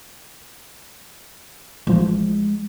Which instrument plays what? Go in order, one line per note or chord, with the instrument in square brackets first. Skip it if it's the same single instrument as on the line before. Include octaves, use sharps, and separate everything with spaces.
[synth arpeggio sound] A1 F3 [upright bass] G#3